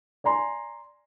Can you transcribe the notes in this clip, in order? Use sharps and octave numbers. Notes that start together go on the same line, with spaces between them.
D5 G#5 A#5 C6